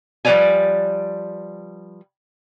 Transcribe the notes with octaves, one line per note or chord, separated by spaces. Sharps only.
F3 G3 B4 C#5 D5 G#5